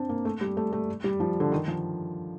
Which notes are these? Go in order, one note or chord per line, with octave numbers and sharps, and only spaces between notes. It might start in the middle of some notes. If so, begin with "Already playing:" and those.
Already playing: C4 D4
A#3
A3
G3
A3
A3
G3
F3
D3
D#3
F3